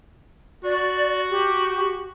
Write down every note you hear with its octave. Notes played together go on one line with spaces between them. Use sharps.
F#4 D5
G4